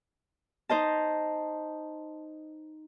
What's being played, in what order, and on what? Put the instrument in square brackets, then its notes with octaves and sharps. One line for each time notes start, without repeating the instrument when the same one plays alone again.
[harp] D#4 C5 D#5 A5